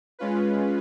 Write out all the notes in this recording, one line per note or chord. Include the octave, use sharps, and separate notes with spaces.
G#3 C#4 F4 B4